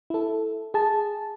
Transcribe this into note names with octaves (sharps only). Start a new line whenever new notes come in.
E4 A4
G#4 A5